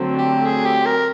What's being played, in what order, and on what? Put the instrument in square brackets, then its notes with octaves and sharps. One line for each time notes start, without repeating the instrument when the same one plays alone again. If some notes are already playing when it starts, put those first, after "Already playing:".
Already playing: [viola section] D3 F#3 A3 C4
[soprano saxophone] G4
G#4
G4
A#4